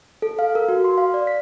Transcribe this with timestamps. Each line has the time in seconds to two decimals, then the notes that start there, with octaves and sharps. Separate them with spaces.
0.22 A4
0.39 F5
0.55 A#4
0.69 F#4
0.84 C6
0.98 F5
1.14 D5
1.27 B6